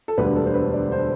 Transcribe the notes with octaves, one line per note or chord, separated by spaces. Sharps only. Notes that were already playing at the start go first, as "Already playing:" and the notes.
A4
E1 D2 D3 G3 B4
A4
C5
B4
D5
C5